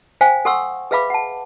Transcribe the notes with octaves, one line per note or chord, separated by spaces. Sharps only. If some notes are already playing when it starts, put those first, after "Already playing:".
C5 F5 G5 G#5
A4 F#5 C6 C#6 E6
G#4 B4 E5 F5 B5 D6
F#5 A5